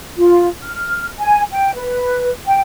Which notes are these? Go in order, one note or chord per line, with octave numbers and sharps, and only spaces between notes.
F4
F6
G#5
G5
B4
G5